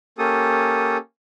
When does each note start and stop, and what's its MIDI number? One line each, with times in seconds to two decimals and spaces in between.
0.18 0.97 58
0.18 0.97 61
0.18 0.97 67
0.18 0.97 69
0.18 0.97 87